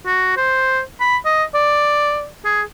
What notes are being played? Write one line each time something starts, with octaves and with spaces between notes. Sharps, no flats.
F#4
C5
B5
D#5
D5
G#4